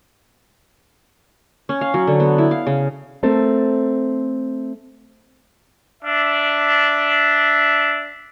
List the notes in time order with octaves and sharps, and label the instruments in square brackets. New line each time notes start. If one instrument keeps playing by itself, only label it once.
[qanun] C#4
F5
F#3
D3
B3
E4
F5
C#3
[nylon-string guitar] A3 C4 A4 A#4
[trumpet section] D4 E5